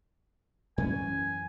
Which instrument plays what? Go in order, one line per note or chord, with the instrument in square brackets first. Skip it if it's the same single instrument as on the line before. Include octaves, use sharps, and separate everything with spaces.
[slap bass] F#2 E3 C#4 [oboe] G#5